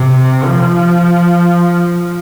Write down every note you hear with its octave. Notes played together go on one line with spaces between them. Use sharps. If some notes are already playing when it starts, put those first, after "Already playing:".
Already playing: C3
F3